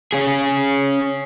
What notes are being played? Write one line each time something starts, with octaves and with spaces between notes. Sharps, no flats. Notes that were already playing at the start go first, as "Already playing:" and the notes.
C#4 G#4